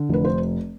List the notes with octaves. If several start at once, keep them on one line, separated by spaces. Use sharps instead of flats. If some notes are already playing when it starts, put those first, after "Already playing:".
Already playing: D3
F1 B4
C5